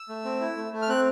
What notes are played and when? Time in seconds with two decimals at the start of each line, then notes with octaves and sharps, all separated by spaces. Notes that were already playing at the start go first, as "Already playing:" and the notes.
Already playing: E6
0.09 A3
0.25 C4
0.41 E4
0.57 A3
0.73 A3
0.82 F6
0.89 C4 F#6